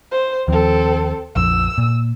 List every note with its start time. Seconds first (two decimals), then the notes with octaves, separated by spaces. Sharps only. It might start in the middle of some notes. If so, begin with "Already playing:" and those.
0.12 C5
0.48 D#2 F3 C4 A4
1.36 A#1 F2 F3 E6
1.78 A#2